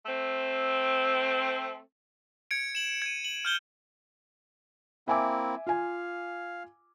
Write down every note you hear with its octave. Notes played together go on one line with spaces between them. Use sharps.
A3 C4
G#6 C#7 D7
E7 F#7
G#6 D#7
F#7
F6 G6 G7
A#3 C4 E4 E5 G#5 D6
F4 F5 G#5